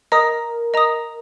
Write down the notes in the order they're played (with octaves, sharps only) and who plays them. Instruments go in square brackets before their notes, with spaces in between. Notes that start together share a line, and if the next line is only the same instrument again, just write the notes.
[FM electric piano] A#4 [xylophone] D#5 A#5 D#6
[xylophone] D#5 A#5 D#6